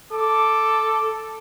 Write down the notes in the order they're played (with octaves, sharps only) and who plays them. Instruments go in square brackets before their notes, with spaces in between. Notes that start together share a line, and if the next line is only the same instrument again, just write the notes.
[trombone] A4 [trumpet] D6